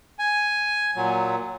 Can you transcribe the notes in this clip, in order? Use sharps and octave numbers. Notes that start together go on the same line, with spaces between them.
G#5
A#2 F#3